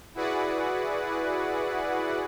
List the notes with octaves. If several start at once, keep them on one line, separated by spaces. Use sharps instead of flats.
E4 F#4 G#4 B4 D5 F#5